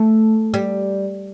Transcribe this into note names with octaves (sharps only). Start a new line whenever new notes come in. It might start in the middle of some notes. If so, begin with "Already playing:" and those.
Already playing: A3
G3